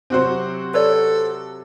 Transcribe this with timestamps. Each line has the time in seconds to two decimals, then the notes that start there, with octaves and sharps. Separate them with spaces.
0.10 C3 F#3 C4 F#4 C5
0.74 A4 B4 C#5 D5